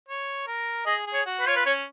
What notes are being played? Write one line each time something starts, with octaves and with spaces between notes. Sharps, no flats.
C#5
A#4
G#4 D#5
G#4
C#5
F#4
B4
F4 C#5
B4
C#4 C#5